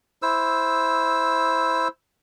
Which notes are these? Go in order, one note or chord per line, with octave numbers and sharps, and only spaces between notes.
E4 C5 E6